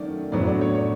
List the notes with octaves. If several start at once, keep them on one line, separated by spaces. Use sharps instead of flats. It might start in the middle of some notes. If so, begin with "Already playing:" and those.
Already playing: D#3 F#3 A3 C#4 D5
A2 F#3 B3 D4 D5
D5
C#5
C#5